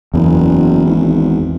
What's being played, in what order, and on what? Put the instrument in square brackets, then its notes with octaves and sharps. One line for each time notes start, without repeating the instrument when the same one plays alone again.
[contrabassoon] F#1 [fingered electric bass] E2
[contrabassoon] G#1